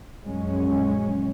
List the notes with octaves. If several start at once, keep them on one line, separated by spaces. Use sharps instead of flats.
A#1 F#2 F#3 G#3 C#4